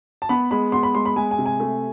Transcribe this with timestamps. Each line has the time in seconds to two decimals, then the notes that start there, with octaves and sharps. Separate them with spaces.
0.22 A5
0.29 B3 B5
0.51 G#3 B5
0.72 B3 C6
0.83 B5
0.95 G#3 C6
1.05 B5
1.16 G#3 G#5
1.31 G#5
1.38 C3
1.46 G#5
1.60 A3